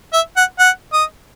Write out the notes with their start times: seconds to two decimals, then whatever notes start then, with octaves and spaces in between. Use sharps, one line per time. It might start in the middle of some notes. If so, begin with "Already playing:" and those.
0.13 E5
0.37 F#5
0.59 F#5
0.93 D#5